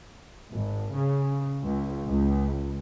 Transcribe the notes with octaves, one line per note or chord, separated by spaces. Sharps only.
G#1
C#3
C#2
C#2